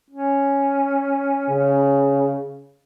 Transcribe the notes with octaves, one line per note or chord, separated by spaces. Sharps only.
C#4
C#3